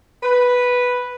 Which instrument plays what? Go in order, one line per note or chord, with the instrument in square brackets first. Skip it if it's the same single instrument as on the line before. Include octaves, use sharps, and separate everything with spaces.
[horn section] B4